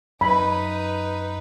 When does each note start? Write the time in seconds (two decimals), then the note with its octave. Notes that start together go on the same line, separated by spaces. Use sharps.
0.21 F#2 D#4 B4 B5